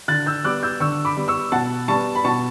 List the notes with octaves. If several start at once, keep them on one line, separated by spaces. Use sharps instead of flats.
D3 F#6 A6
E6 G6
G3 B3 D6 F#6
E6 G6
D3 C#6 E6
B5 D6
G3 B3
C#6 E6
B2 F#5 A5
G3 B3 A5 C#6
B5
B2 A5 C#6